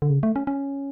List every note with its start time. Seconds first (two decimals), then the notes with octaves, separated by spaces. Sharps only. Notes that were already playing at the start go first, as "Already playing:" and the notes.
0.02 D3
0.10 C#3
0.23 A3
0.36 C#4
0.47 C#4